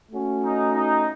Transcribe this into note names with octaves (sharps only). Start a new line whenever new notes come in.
A3 C#4 F#4
D#4
D#4